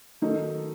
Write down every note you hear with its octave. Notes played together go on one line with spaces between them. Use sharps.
D#3 F#3 A3 D#4